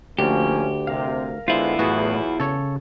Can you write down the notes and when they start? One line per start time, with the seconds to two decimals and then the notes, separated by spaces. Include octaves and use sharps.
0.19 D2 F3 A#3 C#4 G4
0.87 C3 A#4 F5
1.48 D3 G#3 B3 E4 F4 C5
1.79 E2 A2 F#3 B3 F#4 G#4
2.40 C#3 A4 C#5